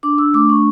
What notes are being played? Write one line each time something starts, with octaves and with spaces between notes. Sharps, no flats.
D4 D6
D4 E6
A3 D6
D4 C#6